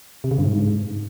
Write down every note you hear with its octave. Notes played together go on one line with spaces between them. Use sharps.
C3
C#3
G2
G#2